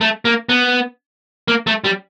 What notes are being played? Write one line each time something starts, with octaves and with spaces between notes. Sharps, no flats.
A3
A#3
B3
A#3
A3
G3